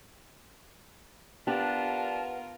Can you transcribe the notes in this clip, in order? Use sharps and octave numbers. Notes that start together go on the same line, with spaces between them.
B3 D4 F4 G4 A#4 A5